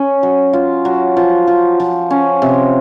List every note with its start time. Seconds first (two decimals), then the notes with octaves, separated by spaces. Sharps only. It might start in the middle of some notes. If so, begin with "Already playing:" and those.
Already playing: C#4
0.23 F#3
0.53 F4
0.85 F#3
1.17 F3
1.47 F3
1.80 F3
2.10 C#4
2.42 C3